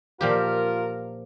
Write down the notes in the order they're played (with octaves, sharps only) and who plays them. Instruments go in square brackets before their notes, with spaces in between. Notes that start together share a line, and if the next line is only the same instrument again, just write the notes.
[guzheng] A#2 F3 G4 [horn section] F4 A#4